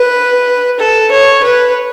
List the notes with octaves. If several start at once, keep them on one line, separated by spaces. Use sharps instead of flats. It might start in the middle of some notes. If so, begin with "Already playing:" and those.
Already playing: B4
A4
C#5
B4